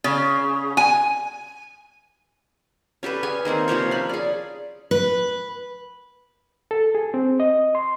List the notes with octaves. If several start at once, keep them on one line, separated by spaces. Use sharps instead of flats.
C#3
G#5
C#4 G4 A4 B4
C#4 G#4 G#5
D#3 A#3 C4 G#4
C3 F3 A#3 C#5
C#4 B5
G#4 D5
B4
A4
G#4
C4
D#5
C6